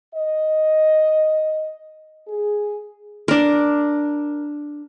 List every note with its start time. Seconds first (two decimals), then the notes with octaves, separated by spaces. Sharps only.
0.15 D#5
2.28 G#4
3.28 D4 A#4